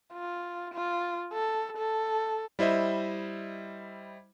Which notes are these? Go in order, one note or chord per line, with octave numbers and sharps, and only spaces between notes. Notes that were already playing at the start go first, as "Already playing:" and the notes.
F4
F4
A4
A4
G3 E4 C5 D#5 E5